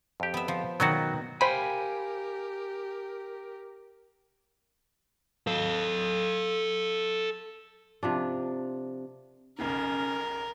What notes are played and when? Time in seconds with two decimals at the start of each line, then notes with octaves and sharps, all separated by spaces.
0.20 F2 G4
0.34 B3 E5
0.48 F3
0.80 B2 D#3 F#3 B3 D#4 F#4
1.41 G4 A#4 C5 F5 G5 G#5 B5
5.47 A4 F5
8.03 C3 F3 D4
9.59 B1 F2 C#3 C#4 A#4